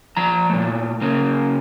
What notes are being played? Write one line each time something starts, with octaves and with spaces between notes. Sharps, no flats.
F3 A#5
A#2 A3
C#3 A#3